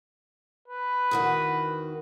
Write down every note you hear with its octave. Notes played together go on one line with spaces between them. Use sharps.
B4
E2 D#3 F#4